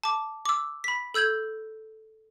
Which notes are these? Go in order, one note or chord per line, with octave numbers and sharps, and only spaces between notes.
A5 D6
D6 E6
B5 B6
A4 E6 G6 G#6 F#7